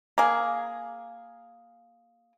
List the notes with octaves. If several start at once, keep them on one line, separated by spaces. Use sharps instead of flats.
A#3 G#4